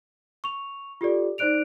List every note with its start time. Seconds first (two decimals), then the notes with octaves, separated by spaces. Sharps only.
0.44 C#6 F7
1.01 F4 G4 A4 D5
1.38 D#4 C5 D5 F#6 D7 F7